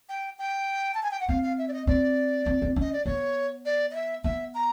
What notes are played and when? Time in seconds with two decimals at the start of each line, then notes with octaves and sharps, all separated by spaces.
0.09 G5
0.39 G5
0.94 A5
1.03 G#5
1.11 G5
1.20 F#5
1.28 C4 F5
1.42 F5
1.58 E5
1.68 D5
1.73 D#5
1.87 C4 D5
2.46 C4
2.62 C4
2.76 C#4 D#5
2.93 D5
3.05 B3 C#5
3.65 D5
3.91 D#5
3.94 E5
4.24 B3 E5
4.54 A#5